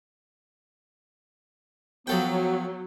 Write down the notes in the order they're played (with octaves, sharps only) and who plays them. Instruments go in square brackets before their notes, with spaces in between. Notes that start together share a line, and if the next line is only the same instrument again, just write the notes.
[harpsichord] F3 A4 G5 [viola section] F#3 [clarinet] B3